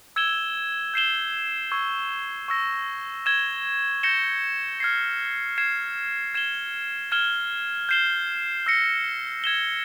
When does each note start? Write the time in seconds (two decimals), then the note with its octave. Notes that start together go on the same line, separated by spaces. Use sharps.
0.16 E6 G#6 E7 G7
0.94 G6 C7 E7 G7
1.72 C#6 E6 G#6
2.48 C#6 E6 A#6
3.26 E6 G#6 E7 G7
4.03 G6 A#6 C#7 E7 G7
4.80 F6 G#6 C7
5.58 G#6 C7 E7
6.35 G#6 E7 G7
7.12 F6 G#6 E7 G7
7.89 G6 C7 E7 G7
8.66 E6 G6 A#6 C#7
9.44 G#6 E7 G7